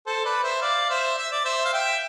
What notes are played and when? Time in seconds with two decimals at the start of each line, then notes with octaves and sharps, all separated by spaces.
0.06 A4 C5
0.25 B4 D5
0.43 C5 E5
0.62 D5 F5
0.90 C5 E5
1.18 E5
1.32 D5
1.44 C5 E5
1.65 F5
1.73 E5 G5